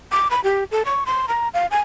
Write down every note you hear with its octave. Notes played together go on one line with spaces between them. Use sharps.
D6
B5
G4
A4
C#6
C6
A#5
F5
G#5